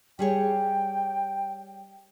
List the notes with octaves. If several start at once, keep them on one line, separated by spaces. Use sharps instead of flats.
G3 G#4 C#5 G5